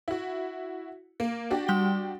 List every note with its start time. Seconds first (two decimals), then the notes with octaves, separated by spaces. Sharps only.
0.08 E4 F#4
1.20 A#3
1.51 D4 F#4 G4
1.68 G3 F#5 G7